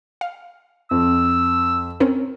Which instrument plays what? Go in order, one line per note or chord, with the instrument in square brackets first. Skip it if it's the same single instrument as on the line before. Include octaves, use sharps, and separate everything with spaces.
[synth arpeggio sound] F5
[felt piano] F2 [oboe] E6
[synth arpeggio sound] C4 C#4 A#4